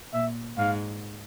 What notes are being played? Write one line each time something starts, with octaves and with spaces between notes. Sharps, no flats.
A#2 E5
G#2 F5